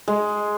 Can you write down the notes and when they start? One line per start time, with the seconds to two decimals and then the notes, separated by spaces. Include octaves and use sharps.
0.08 G#3